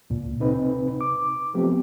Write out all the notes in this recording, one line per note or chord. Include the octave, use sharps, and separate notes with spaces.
C#2 A#2
C3 C4 D#4 B4
D6
F3 F#3 A3 B3 C4 G4